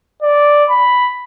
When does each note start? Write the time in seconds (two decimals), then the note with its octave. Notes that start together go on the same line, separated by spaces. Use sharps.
0.22 D5
0.70 B5